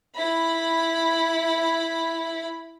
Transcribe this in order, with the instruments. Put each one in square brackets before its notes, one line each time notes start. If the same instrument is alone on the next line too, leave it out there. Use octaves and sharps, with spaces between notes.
[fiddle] E4 B5